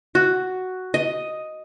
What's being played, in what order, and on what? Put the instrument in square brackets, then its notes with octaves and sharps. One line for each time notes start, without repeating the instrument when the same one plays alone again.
[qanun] F#4
D#5